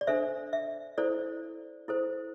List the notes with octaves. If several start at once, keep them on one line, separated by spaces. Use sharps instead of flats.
D5
D4 A4 C5 E5
E5
E4 A4 C5 D5
E4 A4 C5